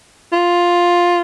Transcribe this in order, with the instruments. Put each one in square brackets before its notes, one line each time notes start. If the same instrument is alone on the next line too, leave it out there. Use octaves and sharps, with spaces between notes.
[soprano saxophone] F4